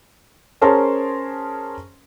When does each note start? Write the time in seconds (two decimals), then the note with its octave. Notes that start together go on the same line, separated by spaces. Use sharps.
0.62 C#4 G#4 A#4 C5 A5 C6